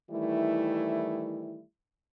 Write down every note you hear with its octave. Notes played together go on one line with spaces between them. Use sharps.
D#3 E3 G3 A3 E4